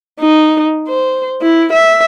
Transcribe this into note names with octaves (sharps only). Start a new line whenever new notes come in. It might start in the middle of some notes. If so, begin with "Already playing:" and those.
D#4
C5
E4
E5